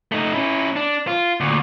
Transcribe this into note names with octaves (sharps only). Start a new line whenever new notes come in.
A3 D#4
C#4 E4
D4
F4
D2 A#2